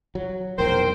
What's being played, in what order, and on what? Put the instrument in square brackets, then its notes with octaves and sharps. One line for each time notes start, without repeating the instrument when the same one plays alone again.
[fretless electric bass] F#3
[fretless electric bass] F1 B1 E2 [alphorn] A#4 [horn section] C5 [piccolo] G5